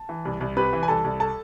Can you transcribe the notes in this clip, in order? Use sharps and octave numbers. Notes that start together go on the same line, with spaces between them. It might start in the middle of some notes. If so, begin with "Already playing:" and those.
Already playing: A5
E3
C2
C2
C3 B4 B5
E3
G#5
C2 A4 A5
C2
A4 A5